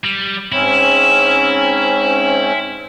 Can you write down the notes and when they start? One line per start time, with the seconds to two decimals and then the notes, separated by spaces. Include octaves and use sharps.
0.04 G3
0.52 G#2 C4 C#4 E4